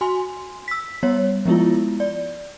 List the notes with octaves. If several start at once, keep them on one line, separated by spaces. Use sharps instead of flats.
F#4 G#5 C6
E6 B6
G3 B3 C#5
F3 G#3 B3 E4 F4
D5